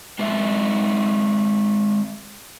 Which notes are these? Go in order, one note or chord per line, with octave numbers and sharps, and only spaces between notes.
G#3 C4 D#5 E5